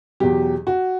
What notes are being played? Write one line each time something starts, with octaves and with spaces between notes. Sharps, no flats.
E2 B2 F#3 G4
F#4